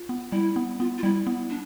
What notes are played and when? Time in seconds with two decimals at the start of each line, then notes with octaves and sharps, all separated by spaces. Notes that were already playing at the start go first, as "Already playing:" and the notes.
Already playing: F4
0.09 B3
0.32 G3 E4
0.56 B3
0.79 B3 F4
0.98 F4
1.03 G3 E4
1.26 B3 E4
1.50 D4